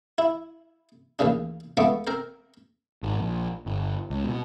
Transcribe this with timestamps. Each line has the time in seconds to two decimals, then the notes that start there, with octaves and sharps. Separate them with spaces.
0.18 E4
1.19 A1 D#2 C#3 D4
1.77 C#2 F3 A3 B3 C#6 D6
2.07 C4 A#4 C5
3.03 G#1
3.17 A#1
3.66 G1
4.10 C#2
4.24 B2